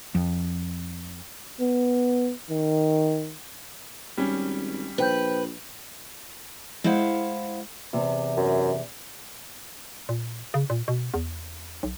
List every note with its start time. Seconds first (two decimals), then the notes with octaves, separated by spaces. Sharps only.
0.15 F2
1.60 B3
2.50 D#3
4.17 G#1 G3 C#4
4.98 A#1 B4 C5 G5 G6
6.84 G#3 E4 C5 F5 F#5
7.93 E2 C3
8.37 F#2
10.09 A#2
10.54 C#3
10.70 A#2
10.88 B2
11.14 E2
11.83 B1